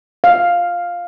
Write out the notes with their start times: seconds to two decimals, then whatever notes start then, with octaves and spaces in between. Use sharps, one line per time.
0.24 F5